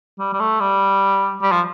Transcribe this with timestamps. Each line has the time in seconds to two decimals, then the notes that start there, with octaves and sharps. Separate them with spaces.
0.19 G3
0.33 G3
0.40 A3
0.60 G3
1.42 G3
1.52 F3